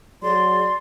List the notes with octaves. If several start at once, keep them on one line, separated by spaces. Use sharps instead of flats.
F#3 G#4 D5 C6